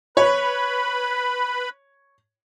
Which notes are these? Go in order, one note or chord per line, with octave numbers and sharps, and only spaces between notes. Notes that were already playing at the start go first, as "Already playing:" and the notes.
B4 C#5 B5